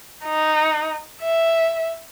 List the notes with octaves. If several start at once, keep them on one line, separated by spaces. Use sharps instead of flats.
D#4
E5